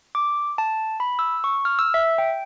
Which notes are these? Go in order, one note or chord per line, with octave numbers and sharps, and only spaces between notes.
D6
A5
B5
E6
C#6
F6
E6
E5
G5